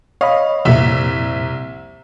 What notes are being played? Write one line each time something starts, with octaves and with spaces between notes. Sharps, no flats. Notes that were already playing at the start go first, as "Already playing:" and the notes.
C#5 D#5 F5 B5
C2 F2 A#2 E5